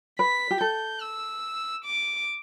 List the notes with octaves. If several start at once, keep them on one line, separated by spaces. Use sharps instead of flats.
B4 B6
G4
A4 G6
E6
D6